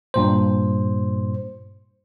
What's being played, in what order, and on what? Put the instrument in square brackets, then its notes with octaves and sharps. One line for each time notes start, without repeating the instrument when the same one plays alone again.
[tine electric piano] G2 A#2 C5